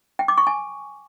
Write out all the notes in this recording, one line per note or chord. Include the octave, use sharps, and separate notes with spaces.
G5
D6
C#6
G#5